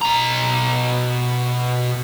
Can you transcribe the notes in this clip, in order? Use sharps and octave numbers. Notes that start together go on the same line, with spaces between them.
B2 A#5